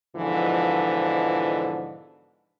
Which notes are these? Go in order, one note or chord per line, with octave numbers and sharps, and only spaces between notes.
G#2 B2 D3 E3 F3